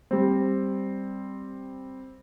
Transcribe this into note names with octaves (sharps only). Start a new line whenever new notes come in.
G3 C4